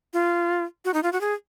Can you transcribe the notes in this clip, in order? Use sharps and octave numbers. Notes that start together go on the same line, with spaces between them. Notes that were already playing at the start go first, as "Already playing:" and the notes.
F4
F#4
D#4
F4
F#4
G#4